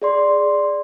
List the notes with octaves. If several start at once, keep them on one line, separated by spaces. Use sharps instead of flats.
G#4 D5 C6